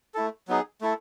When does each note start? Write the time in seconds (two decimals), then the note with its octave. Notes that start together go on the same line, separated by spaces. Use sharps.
0.14 A3 E4 A4
0.48 F#3 B3 D#4 G#4
0.81 A3 E4 A4